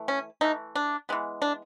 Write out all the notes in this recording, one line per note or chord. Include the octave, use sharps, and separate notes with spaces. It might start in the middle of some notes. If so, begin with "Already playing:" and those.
Already playing: E3 A3
C#4
E3 A3 D#4
D4
E3 G#3 B3
D4